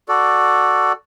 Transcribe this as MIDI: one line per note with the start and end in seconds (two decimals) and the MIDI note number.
0.08 0.93 66
0.08 0.93 69
0.08 0.93 74